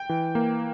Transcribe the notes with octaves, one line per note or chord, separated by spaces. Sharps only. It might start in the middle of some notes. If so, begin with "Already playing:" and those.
Already playing: G5
E3
A#3